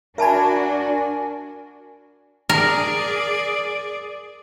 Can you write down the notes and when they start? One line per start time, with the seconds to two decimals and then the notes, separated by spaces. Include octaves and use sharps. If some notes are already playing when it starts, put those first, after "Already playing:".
0.18 D4 F#4 A#4 E5 G#5 A5 B5
2.49 G#4 A#4 D5